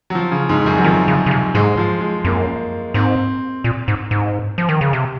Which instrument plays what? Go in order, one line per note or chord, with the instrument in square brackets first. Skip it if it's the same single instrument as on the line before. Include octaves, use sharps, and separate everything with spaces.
[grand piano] F#3
F3
C#3
G#2
F2
F#2
F#3
[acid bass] D#3 [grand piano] F3
[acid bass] C#3
C#3
C3
[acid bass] G#2 [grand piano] G#3
[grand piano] F3
G#3
[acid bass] F#2 [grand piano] A#3
[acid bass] G#2 [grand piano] C4
[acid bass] A#2
G#2
G#2
F3
D#3
C#3
C3